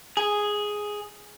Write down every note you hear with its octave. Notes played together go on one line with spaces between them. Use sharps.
G#4